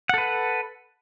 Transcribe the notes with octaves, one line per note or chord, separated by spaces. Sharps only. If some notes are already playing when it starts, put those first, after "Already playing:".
A4 B4 F#5